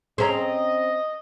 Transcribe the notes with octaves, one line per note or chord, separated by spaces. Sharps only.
C4 C#4 G#4 D#5 A#5